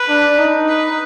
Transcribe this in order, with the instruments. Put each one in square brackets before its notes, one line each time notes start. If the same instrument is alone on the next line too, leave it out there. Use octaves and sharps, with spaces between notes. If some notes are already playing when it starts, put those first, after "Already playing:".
Already playing: [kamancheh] B4
[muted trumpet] D4
D#4
[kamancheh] B4